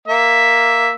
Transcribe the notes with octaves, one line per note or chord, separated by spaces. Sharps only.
A#3 E5